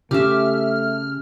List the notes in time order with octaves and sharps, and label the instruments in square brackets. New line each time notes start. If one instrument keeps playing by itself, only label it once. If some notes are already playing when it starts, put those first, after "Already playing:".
[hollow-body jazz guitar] C#3 [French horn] A3 [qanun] G4 E5 [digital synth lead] F6